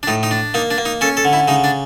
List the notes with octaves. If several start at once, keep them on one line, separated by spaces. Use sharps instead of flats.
D4
A2 D#4
D#4
D4
A#3 D#4
D4
A#3
D#4
C#4 A4
A4
D3
E4
C#3 D#4
D4